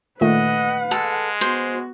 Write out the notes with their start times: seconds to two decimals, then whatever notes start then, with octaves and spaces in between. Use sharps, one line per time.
0.21 A#2 D#3 A3 B4 D#5 F#5
0.91 G#3 A4 F6
1.41 B3 F#4 C5